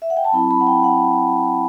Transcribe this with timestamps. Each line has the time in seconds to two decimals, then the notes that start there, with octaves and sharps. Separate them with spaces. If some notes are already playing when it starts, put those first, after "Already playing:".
0.02 E5
0.10 F#5
0.17 G5
0.24 A5
0.32 F#3 C4 E4 B5
0.51 B5
0.60 F#5
0.67 G5
0.84 F#5